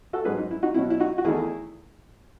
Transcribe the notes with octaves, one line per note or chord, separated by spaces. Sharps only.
F#4 A4
G#2 F#3 C#4 G#4 B4
D#4
E4
D#4 F#4
B2 F#3 C#4 E4
E4
D#4 F#4
F#4
E2 D#3 A3 D#4 E4 G#4